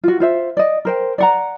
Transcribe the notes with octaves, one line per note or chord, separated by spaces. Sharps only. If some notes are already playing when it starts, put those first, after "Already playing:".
F4 F#4
F4 C5 E5
D5 D#5
A#4 C5 G5
D5 F#5 A#5